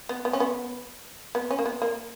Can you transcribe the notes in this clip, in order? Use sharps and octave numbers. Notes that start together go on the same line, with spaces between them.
B3
B3
C#4
B3
B3
C#4
A#3
B3
A#3